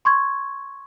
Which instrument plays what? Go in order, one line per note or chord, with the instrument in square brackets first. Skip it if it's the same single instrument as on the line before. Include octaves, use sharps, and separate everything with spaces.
[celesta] C6 C#6 G#6